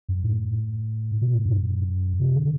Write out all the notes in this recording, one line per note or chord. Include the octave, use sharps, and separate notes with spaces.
F#2
A2
B2
A2
G2
F#2
C3
D3